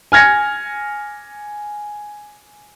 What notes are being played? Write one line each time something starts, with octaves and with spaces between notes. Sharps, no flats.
G#5 F6 G#6 A#6 C#7